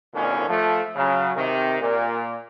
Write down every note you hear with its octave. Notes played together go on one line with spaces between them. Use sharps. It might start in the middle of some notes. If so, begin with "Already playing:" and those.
G#1 F2 A#2 D3 D#3 C#4
F3 A3
C#3 F#3
C3 D#3
A#2